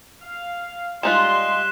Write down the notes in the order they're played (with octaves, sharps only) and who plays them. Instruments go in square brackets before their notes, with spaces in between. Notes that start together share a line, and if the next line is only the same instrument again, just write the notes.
[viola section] F5
[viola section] G3 C6 [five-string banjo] G#3 D#4 F4 [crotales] F#6 B6 E7